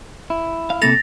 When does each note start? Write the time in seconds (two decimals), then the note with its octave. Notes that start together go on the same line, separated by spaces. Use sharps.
0.30 E4
0.70 F5
0.82 C3 A#3 A4 A6 A#6 F7